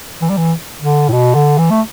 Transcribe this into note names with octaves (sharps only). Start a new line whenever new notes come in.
E3
G3
E3
D3
A2
B2
D3
E3
A3